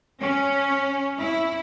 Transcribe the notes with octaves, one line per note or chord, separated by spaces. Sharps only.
C#4
E4